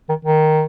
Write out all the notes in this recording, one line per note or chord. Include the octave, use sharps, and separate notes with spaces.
D#3
D#3